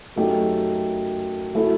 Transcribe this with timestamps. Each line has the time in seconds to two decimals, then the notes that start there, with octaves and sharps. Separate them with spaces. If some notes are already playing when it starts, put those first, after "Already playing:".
0.16 F#2 F#3 A3 D#4 G4
1.54 F#3 A3 E4 A4